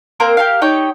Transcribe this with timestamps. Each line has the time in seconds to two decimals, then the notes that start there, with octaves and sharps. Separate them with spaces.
0.20 A#3 C4 A#4 C5
0.37 G4 A4 A#4 F5
0.62 D#4 G4 C#5 G5